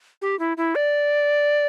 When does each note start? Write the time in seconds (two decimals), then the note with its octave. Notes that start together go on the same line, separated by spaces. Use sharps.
0.22 G4
0.39 E4
0.57 E4
0.75 D5